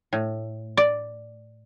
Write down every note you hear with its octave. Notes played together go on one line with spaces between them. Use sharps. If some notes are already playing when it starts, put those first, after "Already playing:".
A2
D5